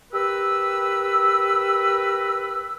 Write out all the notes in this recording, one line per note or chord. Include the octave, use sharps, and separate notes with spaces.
G4 A#4 B4 E6